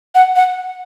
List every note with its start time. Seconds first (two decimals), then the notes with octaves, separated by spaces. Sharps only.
0.15 F#5
0.36 F#5